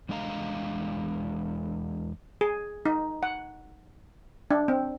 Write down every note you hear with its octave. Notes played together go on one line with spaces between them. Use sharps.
E2 G#3 D4 D#5 F5 A#5
G#4
D#4
F#5
D4
C4